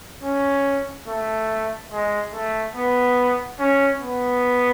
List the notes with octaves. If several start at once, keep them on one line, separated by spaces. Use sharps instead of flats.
C#4
A3
G#3
A3
B3
C#4
B3